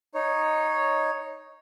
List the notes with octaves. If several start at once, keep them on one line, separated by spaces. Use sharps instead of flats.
D#4 C#5